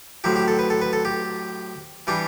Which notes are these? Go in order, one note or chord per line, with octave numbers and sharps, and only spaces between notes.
A2 F#3 C4 G4
G4
A4
B4
A4
B4
A4
G4
E3 G3 D4 G4